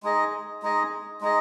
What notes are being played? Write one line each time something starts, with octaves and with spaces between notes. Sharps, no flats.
G#3 D#4 G#4 D#5
G#3 D#4 G#4 D#5
G#3 D#4 G#4 D#5